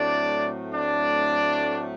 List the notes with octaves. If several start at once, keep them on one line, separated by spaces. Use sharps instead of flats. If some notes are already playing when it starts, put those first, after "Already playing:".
Already playing: A2 F#3 A3 C4 D4 D5
D4 D5